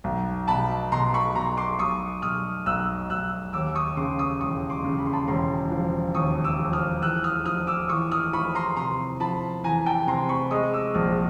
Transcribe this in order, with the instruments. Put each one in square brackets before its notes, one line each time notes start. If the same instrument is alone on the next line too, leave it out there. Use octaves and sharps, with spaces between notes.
[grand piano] B1
[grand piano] B2 [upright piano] A5 B5
[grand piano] B2 [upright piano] A#5 C6
[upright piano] B5 C#6
[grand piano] B2 [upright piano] A#5 C6
[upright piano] C6 D6
[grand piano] B1 [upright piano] C#6 D#6
[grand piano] B1 [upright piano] D#6 F6
[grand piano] B1 [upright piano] E6 F#6
[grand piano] B1 [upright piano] E6 F#6
[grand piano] D#2 [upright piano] D6 E6
[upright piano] C#6 D#6
[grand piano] C#3 [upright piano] C6 D6
[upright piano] C#6 D#6
[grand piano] E1 [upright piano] C#6 D#6
[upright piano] C6 D6
[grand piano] C#3
[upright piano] B5
C6
A5 B5
[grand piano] E1 [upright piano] A#5 C6
[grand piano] F3
[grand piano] D#2 [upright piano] C#6 D#6
[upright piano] D6 E6
[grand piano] F3
[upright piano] D#6 F6
[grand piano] E2 [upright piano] E6 F#6
[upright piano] D#6 F6
[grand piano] F3 [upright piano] D#6 F6
[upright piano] D6 E6
[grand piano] E2 [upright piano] C#6 D#6
[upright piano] D#6 F6
[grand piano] F3 [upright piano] B5 C#6
[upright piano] A#5 C6
[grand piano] C3 [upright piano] A#5 C6
[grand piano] F3 [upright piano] A5 B5
[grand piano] E2 [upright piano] G#5 A#5
[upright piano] G5 A5
[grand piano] C3 [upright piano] A#5 C6
[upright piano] B5 C#6
[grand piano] G#3 [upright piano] C#6 D#6
[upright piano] D6 E6
[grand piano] A#1 [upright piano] D#6 F6